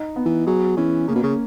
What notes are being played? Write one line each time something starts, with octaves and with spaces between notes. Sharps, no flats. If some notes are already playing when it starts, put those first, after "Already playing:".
Already playing: D#4
B3
E3
F#3 G#4
E3 C#4
C#3 A#3
B2
C#3